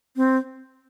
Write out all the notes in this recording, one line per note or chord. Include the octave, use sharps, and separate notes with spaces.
C4